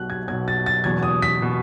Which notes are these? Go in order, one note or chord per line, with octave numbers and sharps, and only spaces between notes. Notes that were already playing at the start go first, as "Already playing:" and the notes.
Already playing: B1 B2 F#6
G#6
B1 B2 G#6
A6
A6
F#1 E2 B2 G#6
D#6
B6
B2